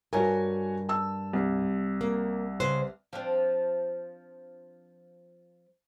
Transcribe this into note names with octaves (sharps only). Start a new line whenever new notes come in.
G2 F#4 A#4 C#5 G#5
A5 E6
C2
A#3
C#3 B4 C5
F3 C4 D4